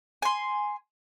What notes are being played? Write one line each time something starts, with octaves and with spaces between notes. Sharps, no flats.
G#5 C6